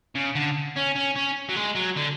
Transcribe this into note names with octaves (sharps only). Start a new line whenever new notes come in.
C#3
D3
C#4
C#4
C#4
F#3
G#3
F#3
D3